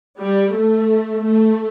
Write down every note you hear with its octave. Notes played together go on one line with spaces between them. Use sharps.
G3
A3
A3